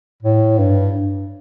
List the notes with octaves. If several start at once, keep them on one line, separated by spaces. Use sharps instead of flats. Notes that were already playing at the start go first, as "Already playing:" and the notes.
A2
G2